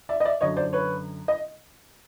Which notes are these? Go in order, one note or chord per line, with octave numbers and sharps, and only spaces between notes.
D5 E5
D#5
D5 E5
F#2 D3 F#3 C#5 D#5
C5 D5
B4 C#5
D#5